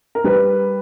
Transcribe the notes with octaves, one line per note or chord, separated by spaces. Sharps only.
A#4
G3 B4